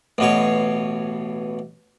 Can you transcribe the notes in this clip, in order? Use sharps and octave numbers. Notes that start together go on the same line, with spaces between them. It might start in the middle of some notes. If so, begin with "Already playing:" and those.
A1 B2 C#5